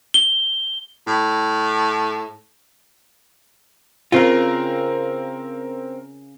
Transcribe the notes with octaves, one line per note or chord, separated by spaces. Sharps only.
G7
A2
C#3 C4 F4 A#4